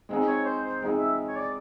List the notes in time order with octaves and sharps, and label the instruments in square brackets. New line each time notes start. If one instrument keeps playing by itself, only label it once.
[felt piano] G#3 C4 D#4 G#4
[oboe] C#5
C5
C5
[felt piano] G#3 C4 D#4 G#4
[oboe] E5
C#5
D5